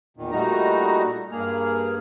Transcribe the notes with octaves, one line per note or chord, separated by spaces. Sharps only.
E2 A#2 D#3
A#2 G3 A3 D#4 F#4 A#5
G2 A#3 G#4 F6